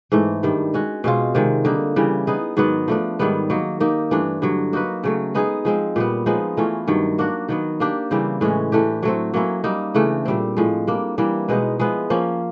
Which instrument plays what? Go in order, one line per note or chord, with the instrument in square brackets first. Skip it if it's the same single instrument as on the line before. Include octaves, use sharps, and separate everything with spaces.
[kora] G#2 E3 A3
G2 D#3 G3
G#3 C#4 F#4
B2 G#3 C4 F4
C3 D#3 G#3
D3 G3 A#3 D#4
C#3 E3 G3
B3 D#4 G#4
G#2 D#3 F#3 B3
F3 A3 D4
G#2 D#3 G3 B3
F#3 A#3 D#4
A#3 D#4 G4 A#4
G2 E3 A3 D4
G2 D3 F#3
A#3 D#4 F#4 B4
C#3 F#3 A3
G#3 B3 D#4 G#4
F3 G#3 C4
A#2 G3 B3
F3 G#3 B3 D#4
E3 A3 C#4 F4
G2 D#3 F#3
A#3 D4 F#4
D#3 F#3 B3
A#3 D4 G4
C#3 E3 G3 C4
A2 E3 G#3 C#4
E3 A3 D4 G4
F#3 A3 C4
F#3 A#3 C#4 E4
G3 A#3 D#4
C#3 E3 A3 D4
A#2 G3 C4
A2 F3 G#3
G3 A#3 D4
E3 G3 A#3
B2 G#3 B3 D#4
F3 G#3 B3 E4
F3 A#3 C#4 F4